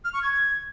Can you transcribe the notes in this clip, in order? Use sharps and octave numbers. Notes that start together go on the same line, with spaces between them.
F6
C#6
G#6